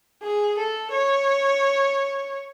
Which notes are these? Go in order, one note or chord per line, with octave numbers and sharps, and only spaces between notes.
G#4
A4
C#5